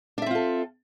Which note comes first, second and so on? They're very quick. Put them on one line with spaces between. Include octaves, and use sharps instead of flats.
D4 E5 C4 F4 A4